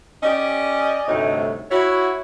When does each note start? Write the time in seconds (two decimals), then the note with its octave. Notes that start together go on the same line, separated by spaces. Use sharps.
0.23 C#4 G4 D5 D#5
1.08 D2 G2 C3 A3 D#4 C#5
1.71 E4 F#4 C#5